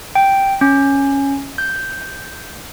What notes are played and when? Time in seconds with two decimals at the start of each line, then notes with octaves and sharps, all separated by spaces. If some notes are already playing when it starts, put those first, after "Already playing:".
0.15 G5
0.61 C#4
1.58 G6